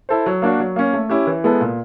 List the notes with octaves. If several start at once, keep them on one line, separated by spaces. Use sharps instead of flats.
E4 A4 C5
F#3
A#3 D4 F#4
F#3
A#3 C#4
A3
C#4 E4 G4
E3
G#3 B3 E4 A4
A#2